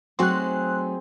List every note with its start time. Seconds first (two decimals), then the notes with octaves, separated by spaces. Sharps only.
0.19 F#3 A3 C4 D#4 F#4 G#4 C6 F#6